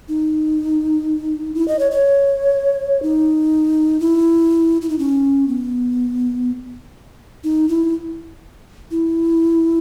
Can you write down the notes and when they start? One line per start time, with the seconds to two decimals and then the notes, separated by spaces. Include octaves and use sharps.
0.08 D#4
1.54 E4
1.68 D#5
1.79 C#5
1.91 C#5
3.02 D#4
4.00 E4
4.81 E4
4.89 D#4
4.99 C#4
5.48 B3
7.44 D#4
7.68 E4
8.91 E4